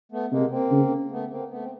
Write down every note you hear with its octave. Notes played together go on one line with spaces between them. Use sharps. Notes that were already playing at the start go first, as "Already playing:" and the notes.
A3 B3
C3 G#3 A#3
A#3 C4
C#3
A3 B3
A#3 C4
A3 B3
C4